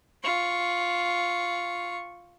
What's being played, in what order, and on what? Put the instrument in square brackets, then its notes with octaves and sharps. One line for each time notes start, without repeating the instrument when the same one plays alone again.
[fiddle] F4 C#6